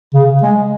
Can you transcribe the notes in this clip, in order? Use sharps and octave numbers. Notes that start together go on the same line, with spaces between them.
C#3
G#3